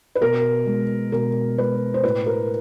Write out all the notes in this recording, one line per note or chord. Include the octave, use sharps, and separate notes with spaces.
B4
B2 A#4
G#3
B2 A#4
G#3 B4
C5
A2 B4
A#4